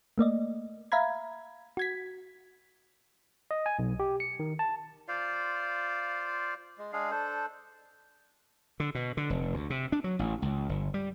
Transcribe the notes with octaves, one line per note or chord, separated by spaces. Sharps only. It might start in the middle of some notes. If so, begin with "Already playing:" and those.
A3 A#3 D5 D#5
E5 F5 A#5 B5 G#6
F#4 G#6 B6
D#5
G#5
B1
G4
C#7
D#3
A5
F4 C5 D5 F5
G#3
G#3 D4 G#4 F5
D4 A4 C5
D3
B2
D3
F1
D2
C3
D4
F#3
A1
C#2
G1
G3